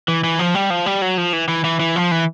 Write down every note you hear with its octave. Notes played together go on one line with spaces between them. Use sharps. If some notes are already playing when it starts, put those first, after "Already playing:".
E3
E3
F3
G3
F3
G3
F#3
F3
E3
E3
E3
E3
F3
E3